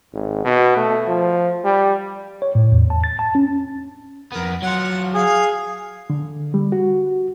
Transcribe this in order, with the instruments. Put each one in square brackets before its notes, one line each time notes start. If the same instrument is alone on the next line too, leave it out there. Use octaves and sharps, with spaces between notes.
[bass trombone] G#1
B2
A3
F3
G3
[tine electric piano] C#5
A2
E2
A5
A6
A5
C#4
[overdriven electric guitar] F2 B3 [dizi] A#4
[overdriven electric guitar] F#3 F4 [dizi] F#5
[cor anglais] G#4 [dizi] F5
[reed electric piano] D3
G3
F#4